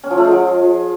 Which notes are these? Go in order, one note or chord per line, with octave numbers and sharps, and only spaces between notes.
C#4
F3
A3
G#3
F3